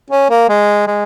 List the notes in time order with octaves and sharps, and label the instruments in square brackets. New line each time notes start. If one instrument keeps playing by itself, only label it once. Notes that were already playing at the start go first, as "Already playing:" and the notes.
[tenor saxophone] C#4
A#3
G#3
G#3